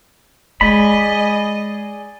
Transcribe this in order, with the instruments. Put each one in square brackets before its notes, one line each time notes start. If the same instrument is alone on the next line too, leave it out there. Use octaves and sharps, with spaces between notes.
[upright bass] G#3 [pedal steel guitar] G#4 D5 B5 [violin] D#5